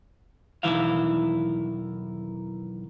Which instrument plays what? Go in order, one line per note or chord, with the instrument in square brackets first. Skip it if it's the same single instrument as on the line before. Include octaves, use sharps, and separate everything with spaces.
[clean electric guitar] B1 E2 D#3 E3 E4 F5